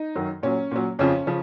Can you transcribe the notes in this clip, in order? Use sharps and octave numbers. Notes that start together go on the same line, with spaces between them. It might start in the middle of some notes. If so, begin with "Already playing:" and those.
Already playing: D#4
F#2 D#3 F#3
A#2 F#3 C#4
A#2 F#3
F2 C#3 F3 C#4
C#3 F3